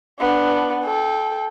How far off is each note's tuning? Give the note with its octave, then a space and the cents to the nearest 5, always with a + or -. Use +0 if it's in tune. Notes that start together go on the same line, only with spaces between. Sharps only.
B3 +0 D4 +0
A4 -25 G5 +5